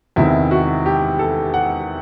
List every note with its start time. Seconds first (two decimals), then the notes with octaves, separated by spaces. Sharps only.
0.16 E2 C3 D#3 E4
0.51 F#4
0.86 G4
1.19 A4
1.54 F#5